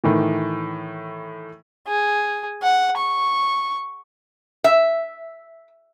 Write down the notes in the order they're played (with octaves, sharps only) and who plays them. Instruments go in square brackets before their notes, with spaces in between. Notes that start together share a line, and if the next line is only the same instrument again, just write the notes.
[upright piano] A2 D#3 E3
[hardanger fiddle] G#4
F#5
C#6
[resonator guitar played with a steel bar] E5